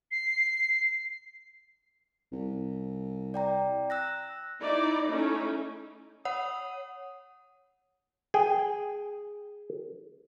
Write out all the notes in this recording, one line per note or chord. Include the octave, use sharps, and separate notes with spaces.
C7
C2
D5 G5 A#5
E6 F#6 A#6
D#4 E4 D5
A3 C#4 D#4 E4
C#5 F#5 D#6
G#4 G5